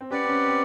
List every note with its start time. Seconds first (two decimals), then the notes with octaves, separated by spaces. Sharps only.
0.01 C4
0.11 C#4 G4 B4 D5 F#5
0.24 C4
0.29 C#4
0.48 C4